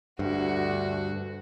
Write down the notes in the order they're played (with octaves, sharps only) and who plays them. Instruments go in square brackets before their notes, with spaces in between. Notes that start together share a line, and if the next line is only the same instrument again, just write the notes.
[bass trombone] D2 [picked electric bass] G2 [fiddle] F#4